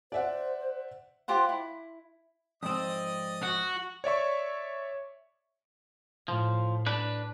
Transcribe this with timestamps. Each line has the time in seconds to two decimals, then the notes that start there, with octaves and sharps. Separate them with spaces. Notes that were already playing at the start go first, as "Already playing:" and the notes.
0.12 C5 D5 E5 F#5
1.28 F4 G4 C5 F#5
1.49 E4
2.63 F2 G#2 C4 D5 D#5 D#6
3.43 F#4
4.04 C#5 D5 E5 C#6
6.28 A2 F3
6.86 D4 B4